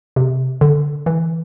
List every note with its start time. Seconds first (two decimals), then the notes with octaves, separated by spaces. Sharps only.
0.16 C3
0.61 D3
1.06 E3